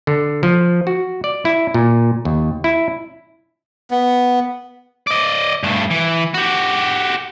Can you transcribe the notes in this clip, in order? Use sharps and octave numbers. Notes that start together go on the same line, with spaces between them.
D3
F3
F#4
D5
E4
A#2
D#2
E4
B3
D5 D#5
G2 A3
E3
F#4 G4